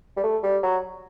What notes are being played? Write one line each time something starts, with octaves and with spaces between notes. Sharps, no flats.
G3
A3
G3
F#3